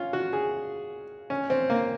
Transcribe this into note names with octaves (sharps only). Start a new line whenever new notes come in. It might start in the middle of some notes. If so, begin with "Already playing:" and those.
Already playing: C#4 F4
F#4
G#4
C#4
C4
A#3